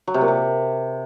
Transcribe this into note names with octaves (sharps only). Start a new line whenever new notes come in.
F#3
C3
A#2
C3